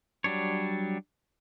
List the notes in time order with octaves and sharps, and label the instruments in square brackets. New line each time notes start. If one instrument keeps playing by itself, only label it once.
[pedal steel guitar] F#3 G3 D4 C#5